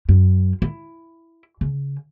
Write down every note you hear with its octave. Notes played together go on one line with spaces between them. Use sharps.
F#2
E4
C#3